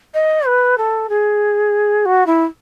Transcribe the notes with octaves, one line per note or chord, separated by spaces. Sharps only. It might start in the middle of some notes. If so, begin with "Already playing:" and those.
D#5
B4
A4
G#4
F#4
E4